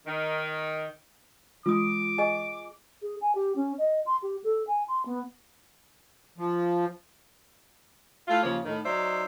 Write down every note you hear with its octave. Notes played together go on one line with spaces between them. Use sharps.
D#3
E3 G#3 F4 D6 D#6
G#4 D#5 G#5
G#4
G#5
G4
C#4
D#5
C6
G4
A4
G#5
C6
B3
F3
A3 E4 F4
D#2 C#3 F3 A#3 C#5
A2 D#3
F#3 D#4 C5 D5 E5